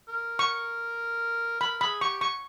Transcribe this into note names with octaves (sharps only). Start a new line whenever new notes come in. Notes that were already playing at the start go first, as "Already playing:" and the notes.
A#4
C#6
A#4 B5
G#4 B5
G4 C#6
C#6